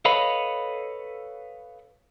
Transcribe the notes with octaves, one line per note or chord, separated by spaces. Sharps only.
A4 B4 C#5 D#5 F5 B5